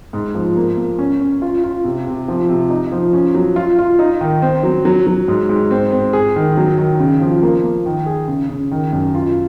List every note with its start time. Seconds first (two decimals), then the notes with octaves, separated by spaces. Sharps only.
0.13 G#2
0.35 F3
0.56 A#3
0.77 A#3
0.99 C#4
1.21 C#4
1.42 F4
1.64 F4
1.84 C3
2.07 C3
2.28 F3
2.49 C3
2.70 D#4
2.92 F3
3.13 C#4
3.35 F#3
3.56 F4
3.79 F4
3.99 D#4
4.21 D#3
4.42 C4
4.63 F#3
4.85 F#3
5.07 F#3
5.28 G#2
5.49 G#2
5.71 C4
5.92 C4
6.13 G#4
6.36 D#3
6.57 F#3
6.78 D#3
7.00 C#3
7.21 F3
7.43 A#3
7.64 A#3
7.86 D#3
8.06 G#4
8.28 C#3
8.49 C#3
8.71 D#3
8.93 F#2
9.15 F4